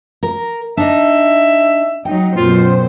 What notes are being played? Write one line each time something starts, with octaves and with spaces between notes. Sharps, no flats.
A#4
D4 D#4 D#5 E5
F#3 D#4 G5
F#2 B2 F4 C5